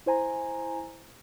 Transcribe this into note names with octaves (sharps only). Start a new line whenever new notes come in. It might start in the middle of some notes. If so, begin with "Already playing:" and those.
E4 C5 G#5 A#5